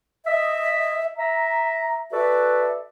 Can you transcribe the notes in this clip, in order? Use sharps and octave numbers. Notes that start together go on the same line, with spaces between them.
D#5 E5
E5 A#5
F#4 A4 B4 D5 E5